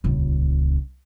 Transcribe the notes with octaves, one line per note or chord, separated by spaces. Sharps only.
D#1 C#2